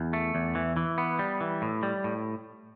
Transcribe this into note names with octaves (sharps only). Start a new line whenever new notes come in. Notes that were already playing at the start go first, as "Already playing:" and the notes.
Already playing: E2
A3
E2
E3
E3
B3
G3
E3
A2
G3
A2